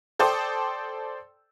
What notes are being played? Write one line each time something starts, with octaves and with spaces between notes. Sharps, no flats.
A4 C5 D5 G5 D#6